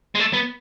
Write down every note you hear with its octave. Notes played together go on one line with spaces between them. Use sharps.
G#3
A3
B3